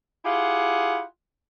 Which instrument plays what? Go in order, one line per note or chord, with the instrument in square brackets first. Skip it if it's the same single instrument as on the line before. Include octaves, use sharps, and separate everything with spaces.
[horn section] E4 F4 G4 G#4 F#5